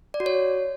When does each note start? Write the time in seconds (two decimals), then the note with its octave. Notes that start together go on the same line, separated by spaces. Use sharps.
0.14 D5
0.20 F#4
0.26 C#5